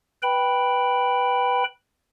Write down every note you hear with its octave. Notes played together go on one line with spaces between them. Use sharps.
B4 G5 B5